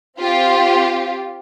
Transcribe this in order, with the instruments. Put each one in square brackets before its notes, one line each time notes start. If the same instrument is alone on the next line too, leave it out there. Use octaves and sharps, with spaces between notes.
[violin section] C4 F4 G4